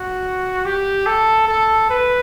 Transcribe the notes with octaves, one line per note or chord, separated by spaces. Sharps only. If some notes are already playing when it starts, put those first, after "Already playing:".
Already playing: F#4
G4
A4
A4
B4